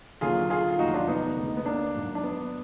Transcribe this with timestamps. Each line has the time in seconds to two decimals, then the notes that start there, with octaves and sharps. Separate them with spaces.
0.21 D#2 D3 F#3 F4 G#4
0.50 F4 G#4
0.70 F4
0.79 F1 D#2 D#3 F#3 D#4 F#4
0.93 D4 F4
1.08 B3 D#4
1.37 D2 D3 G#3
1.57 B3
1.66 A#3 D4
1.95 G#1 G#2 F#3
2.15 D4
2.23 B3